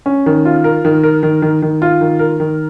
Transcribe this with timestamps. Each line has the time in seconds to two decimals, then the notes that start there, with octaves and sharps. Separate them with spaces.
0.06 C#4
0.26 D#3
0.45 F4
0.64 A#4
0.85 D#3
1.04 A#4
1.23 D#3
1.42 D#3
1.62 D#3
1.82 F4
2.01 D#3
2.19 A#4
2.40 D#3